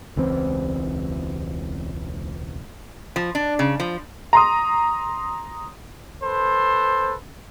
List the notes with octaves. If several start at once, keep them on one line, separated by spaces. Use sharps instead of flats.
E1 C#2 E3 C4
F3
D4
C#3
F3
A#5 C6 D#6
A4 B4 C5